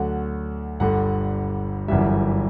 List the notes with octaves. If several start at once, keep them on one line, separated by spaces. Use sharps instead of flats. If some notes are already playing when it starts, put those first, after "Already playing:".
Already playing: D2 D3 F#3 F#5
G1 G2 D3 F#5
G1 F#2 E3 G3 E5